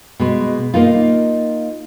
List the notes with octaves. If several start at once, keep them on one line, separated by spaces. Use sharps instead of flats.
B2 G#3
A#3 D#4 F4